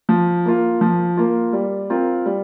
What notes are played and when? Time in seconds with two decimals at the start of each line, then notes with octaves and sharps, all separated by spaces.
0.09 F3
0.45 A#3 F4
0.81 F3
1.17 A#3 F4
1.53 G3
1.90 C4 F4 A#4
2.26 G3